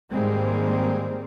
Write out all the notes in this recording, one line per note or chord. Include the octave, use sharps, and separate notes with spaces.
G#2 D#3 G3 G#3 A#3 C4